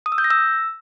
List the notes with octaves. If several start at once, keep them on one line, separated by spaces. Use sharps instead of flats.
D#6
E6
G6
A#6
E6